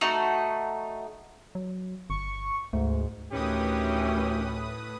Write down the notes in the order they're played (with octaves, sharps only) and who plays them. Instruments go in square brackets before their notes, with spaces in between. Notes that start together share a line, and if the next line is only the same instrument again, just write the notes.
[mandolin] A3 D#4 F#4
[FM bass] F#3
[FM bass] G1 [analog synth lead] C#6
[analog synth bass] D2 [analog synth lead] G#2 [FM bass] A3
[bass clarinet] D2 [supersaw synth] A2 B4 D#6 [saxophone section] D#3 E3 C#4 [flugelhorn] G4